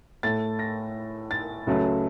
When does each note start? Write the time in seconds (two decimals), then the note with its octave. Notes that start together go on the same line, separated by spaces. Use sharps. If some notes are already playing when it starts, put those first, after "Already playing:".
0.23 A2 A3 A6
0.59 A#6
1.31 A6
1.67 C#2 C#3 F#3 A3